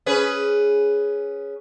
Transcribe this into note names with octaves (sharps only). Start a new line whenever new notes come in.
C#4 G#4 B4